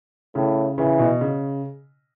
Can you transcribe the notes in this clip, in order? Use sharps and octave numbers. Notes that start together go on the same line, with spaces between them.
A2 C#3
C#3 E3
B2
C#3